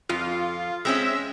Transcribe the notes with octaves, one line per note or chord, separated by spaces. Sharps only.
F2 F4
G#3 C4 C#4 E5